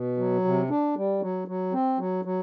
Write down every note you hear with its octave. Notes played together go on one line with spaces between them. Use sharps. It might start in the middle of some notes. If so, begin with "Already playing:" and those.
Already playing: B2
F#3
C3
D4
G3
F#3
F#3
C4
F#3
F#3